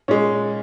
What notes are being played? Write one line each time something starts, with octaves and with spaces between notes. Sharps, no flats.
A#2 G#3 C#4